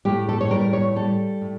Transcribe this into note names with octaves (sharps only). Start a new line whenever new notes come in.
A2 G4
A4
C#5
G3 A#4
C#5
G3 A4
A2